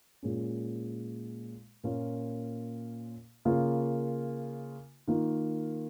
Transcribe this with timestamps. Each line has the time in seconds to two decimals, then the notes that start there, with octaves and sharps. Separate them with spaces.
0.23 A#2 G#3 C#4
1.84 A#2 A#3 C#4 F4
3.45 C#3 A#3 F4
5.07 D#3 A#3 F4